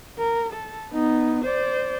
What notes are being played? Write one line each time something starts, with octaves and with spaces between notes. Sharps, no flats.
A#4
A4
B3 D#4
C5 D5